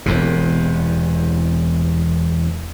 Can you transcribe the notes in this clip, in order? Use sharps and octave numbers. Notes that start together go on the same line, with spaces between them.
E1 E2 C3